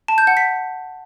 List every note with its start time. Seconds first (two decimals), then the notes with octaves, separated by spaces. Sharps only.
0.08 A5
0.18 G6
0.27 F#5
0.37 B6